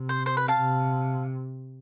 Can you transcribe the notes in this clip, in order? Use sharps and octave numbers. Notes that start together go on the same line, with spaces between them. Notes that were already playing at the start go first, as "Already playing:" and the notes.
Already playing: C3
C5
C5
B4
F5 A5
C3